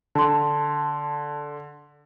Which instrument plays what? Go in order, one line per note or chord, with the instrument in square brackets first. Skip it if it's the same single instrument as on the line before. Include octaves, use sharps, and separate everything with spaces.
[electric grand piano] D3 [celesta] A5 C6